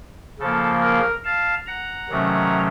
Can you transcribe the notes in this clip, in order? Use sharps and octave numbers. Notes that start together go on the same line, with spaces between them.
C#3 F3 A#3 A4
A#4
F5 A5
F#5 A#5
C3 D#3 F#3 A3 C#4